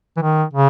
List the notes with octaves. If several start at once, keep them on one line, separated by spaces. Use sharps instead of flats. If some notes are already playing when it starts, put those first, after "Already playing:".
E3
D#3
C#3